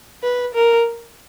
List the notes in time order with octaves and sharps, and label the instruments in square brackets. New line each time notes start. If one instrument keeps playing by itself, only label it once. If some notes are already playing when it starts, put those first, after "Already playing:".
[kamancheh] B4
A#4